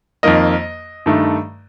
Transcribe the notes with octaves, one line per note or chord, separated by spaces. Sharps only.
F2 D#3 A#3 D#5
G2 D#3 A3